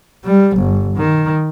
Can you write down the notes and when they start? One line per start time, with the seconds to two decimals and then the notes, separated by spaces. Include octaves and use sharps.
0.25 G3
0.57 G1
0.96 D#3